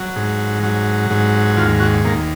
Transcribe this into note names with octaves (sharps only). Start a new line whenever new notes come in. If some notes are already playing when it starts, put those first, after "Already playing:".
Already playing: F#3
G#2
F#3
G#2
D#2 F4
F#4
D#2 A#3